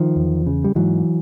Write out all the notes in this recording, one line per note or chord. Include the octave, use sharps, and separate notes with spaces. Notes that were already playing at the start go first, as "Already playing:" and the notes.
Already playing: D#3 F3
E2
C#3
G3
G#2 E3 F#3